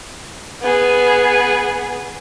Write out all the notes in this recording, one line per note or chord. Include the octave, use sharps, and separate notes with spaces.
B3 G#4